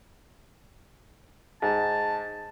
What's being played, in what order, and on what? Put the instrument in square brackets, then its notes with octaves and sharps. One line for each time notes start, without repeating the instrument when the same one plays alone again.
[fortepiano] G#2 [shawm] A5